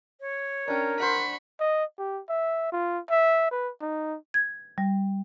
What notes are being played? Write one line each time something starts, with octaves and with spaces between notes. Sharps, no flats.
C#5
C#4 D4 A#4 G5
C5 F#5 B5 C#6
D#5
G4
E5
F4
E5
B4
D#4
G#6
G3